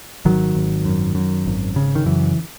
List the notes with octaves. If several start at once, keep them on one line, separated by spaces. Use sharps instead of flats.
G#1 D#3 F#3
G#1
F#2
F#2
G#1
C#3
D#3
F#2 E3